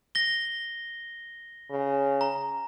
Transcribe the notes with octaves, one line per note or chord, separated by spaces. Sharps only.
A#6 G7
C#3
A#5